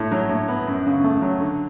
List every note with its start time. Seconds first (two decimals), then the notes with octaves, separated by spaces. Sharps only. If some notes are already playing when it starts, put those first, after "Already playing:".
Already playing: A2
0.11 F#3
0.29 A2
0.48 B3
0.67 F#2
0.86 C#3
1.04 A3
1.22 F#3
1.40 D3